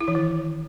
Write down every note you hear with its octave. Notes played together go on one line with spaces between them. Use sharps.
E4
E3
D#3